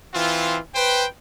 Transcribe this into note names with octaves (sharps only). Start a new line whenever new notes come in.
E3 C4 F4
B4 C5 G5